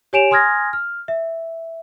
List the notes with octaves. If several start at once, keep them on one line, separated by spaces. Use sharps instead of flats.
G4 C#5 G#5 D7 E7 F7
G#5 C6 D#6 F6 G#6 A#6
F6
E5